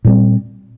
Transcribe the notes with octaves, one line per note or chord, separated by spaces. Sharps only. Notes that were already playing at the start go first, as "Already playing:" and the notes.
A#2 G3 C4